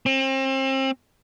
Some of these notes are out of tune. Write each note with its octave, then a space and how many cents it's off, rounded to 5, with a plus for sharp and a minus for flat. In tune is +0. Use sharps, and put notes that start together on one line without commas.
C4 +35